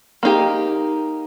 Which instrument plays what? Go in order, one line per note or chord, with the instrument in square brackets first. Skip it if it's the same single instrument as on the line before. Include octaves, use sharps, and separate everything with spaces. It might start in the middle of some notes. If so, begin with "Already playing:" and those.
[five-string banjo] A#3 D#4 G4